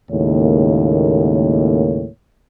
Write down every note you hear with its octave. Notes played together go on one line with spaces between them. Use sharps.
D#2 A2 C#3 G#3 A#3 C#5